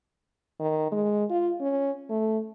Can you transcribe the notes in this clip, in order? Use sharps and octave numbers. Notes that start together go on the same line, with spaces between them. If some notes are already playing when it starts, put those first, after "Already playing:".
D#3
G#3
F4
C#4
A3